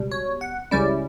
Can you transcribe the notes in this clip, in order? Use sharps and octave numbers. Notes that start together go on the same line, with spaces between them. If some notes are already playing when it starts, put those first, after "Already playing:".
Already playing: C#2 B2 G3
C#5
F#5
C#2 C#3 G3 C#4 E4 D5